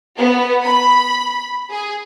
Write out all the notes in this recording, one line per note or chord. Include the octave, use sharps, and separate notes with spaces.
B3
B5
G#4